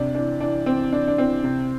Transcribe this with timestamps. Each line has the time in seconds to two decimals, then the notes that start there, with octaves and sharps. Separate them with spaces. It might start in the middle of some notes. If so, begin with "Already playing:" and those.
Already playing: C3 D4
0.15 E3 D4
0.40 E3 D4
0.66 E3 C4
0.92 E3 D4
1.07 D4
1.18 E3 C4
1.44 C3